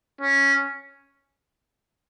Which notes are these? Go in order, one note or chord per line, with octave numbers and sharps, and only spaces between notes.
C#4